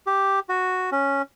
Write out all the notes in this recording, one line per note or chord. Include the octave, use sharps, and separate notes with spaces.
G4
F#4
C#4